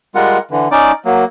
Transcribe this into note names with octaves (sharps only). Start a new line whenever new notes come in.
G3 G#3 F4 A#4 F#5
D3 E3
C#4 D#4 D5 D6
F#3 A#3